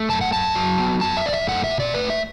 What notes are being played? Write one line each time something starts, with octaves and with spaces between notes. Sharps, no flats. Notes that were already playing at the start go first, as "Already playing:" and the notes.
Already playing: A3
F#2 A5
F#5
F#2 A5
F#3
B3
F#2 A5
E5
F#2 D5
E5
A3 F#5
E5
B2
D5
A3 B4
E5